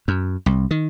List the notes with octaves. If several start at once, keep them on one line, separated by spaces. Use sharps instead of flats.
F#2
C2
D#3